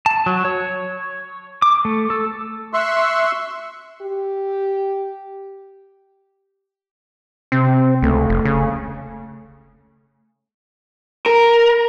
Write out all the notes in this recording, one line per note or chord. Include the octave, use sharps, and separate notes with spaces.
A5
F#3
C#5
D6
A3
A4
E5 C6 C#6 E6 F#6
G4
C3 C4
C#2 A3
F1
C#3
A#4